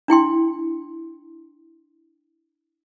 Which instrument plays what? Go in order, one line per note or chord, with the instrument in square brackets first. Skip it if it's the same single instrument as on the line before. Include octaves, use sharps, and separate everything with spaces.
[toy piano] D4 E4 G5 C6